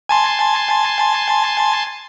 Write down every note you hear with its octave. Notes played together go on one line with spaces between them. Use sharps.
G#5 A5 C6